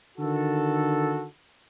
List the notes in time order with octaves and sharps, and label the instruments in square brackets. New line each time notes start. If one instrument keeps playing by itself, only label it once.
[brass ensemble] D3 D#3 F#4 A4